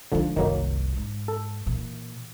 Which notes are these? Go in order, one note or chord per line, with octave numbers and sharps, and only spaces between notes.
D3 F3 G#3 D#4
F#1 C2 D#3 F#3 A#3
G#2
A4
A#2 E3